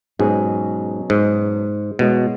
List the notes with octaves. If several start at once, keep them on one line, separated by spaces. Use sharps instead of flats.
G#2 B2 F#3 C#4 G#4
G#2
B2 G#3 B3 E4 C#5